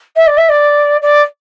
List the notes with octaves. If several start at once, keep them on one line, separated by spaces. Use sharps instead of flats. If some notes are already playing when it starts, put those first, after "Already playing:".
E5
D5
E5
D5
D5